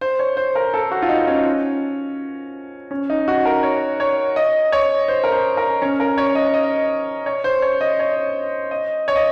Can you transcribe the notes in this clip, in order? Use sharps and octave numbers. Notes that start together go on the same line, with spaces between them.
C5
C#5
C5
A#4
A4
F#4
F4
D#4
C#4
C#4
D#4
F#4
A#4
C#5
C#5
D#5
C#5
C5
A#4
C5
A#4
C#4
A#4
C#5
D#5
D#5
C#5
C5
C#5
D#5
C#5
D#5
C#5
D#5